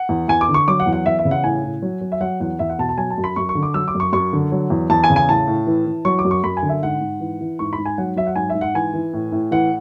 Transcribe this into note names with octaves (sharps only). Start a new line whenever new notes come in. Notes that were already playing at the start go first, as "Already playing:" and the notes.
Already playing: F#5
E2
E2 G#5
D6
D3
C#6
F#3 D6
F#5
E2
F#5
E2 E5
E5
C#3
F#5
A2 G#5
A2
F#3
F#3
E5
F#3 F#5
E2 F#5
E2 E5
F#5
B2 A5
A5
F#3 G#5
A5
F#2
B5
F#2 C#6
C#6
D3
D6
F#3 E6
D6
F#2
C#6
F#2 C#6
D3
F#3
E2
E2 A5
G#5
C#3
G#5
A2 A5
A2
E3
E3
F#3 C#6
D6
F#2
C#6
F#2 B5
G#5
D3
E5
G#2 F#5
G#2
E3
E3
G#2 C#6
B5
G#2
G#5
F#3 F#5
F#3 E5
F#5
G#2 G#5
E5
G#2
F#5
E3 G#5
E3
A2
A2
E3 F#5